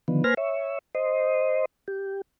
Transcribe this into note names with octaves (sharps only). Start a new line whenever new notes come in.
D3 D#3 F3 B3
A#3 B4 C5 G#5 F6 A#6
C#5 E5
C5 D#5
G4